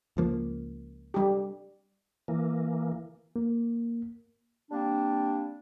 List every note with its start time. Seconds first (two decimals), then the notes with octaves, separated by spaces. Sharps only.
0.17 C#2 F3 A#3
1.14 G3 G4
2.28 E3 A#3
3.36 A#3
4.71 G3 A#3 C4 D4